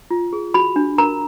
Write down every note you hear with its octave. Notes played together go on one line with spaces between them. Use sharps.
F4
G#4
F#4 B5
D4
A#4 A#5